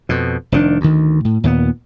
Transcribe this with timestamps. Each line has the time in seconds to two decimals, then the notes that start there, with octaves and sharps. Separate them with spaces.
0.09 F2 B2
0.52 F1 D#3 D4
0.81 D2 D#3
1.25 A2
1.44 D#2 A#2 A#3 B3